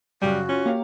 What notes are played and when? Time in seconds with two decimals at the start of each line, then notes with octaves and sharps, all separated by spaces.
0.22 F#2 C#3 G3 F#4
0.49 C#4 F4
0.66 A#3 G4 C#5 F5